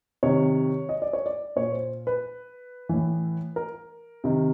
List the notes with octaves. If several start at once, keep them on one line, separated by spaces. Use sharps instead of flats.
C3 D#3 C#5
D#5
D5
C#5
D5
A#2 C#5
C5
B4
A2 E3
A#4
C3 D#3